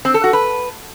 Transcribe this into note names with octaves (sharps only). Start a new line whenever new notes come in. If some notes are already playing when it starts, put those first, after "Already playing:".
C4
A4
F#4
B4